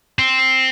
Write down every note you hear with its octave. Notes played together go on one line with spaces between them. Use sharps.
C4